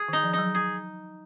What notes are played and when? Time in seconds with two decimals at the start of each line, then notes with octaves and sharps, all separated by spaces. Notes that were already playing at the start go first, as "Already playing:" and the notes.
Already playing: G#4
0.08 D#3
0.13 D#4
0.23 F3
0.33 D#4
0.38 F#3
0.55 G#4